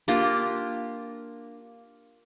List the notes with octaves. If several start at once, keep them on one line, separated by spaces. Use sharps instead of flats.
A#3 D4 F4 G4